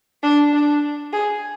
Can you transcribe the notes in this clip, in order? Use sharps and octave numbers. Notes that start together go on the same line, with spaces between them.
D4
D4
G#4